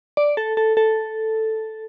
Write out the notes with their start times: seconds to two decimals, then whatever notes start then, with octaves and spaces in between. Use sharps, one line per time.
0.17 D5
0.37 A4
0.57 A4
0.77 A4